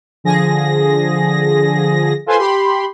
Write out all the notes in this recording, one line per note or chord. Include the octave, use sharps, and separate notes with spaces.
D3 F3 G#4 A#6
F4 A4 B4 C5 G#5 C6
G4 B5 C6